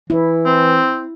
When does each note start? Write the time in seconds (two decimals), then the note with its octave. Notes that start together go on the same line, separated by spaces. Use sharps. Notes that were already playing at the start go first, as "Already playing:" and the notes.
0.10 E3 E4
0.45 C4